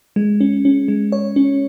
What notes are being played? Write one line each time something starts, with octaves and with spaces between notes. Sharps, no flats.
G#3
C#4
C#4
G#3
C#5
C#4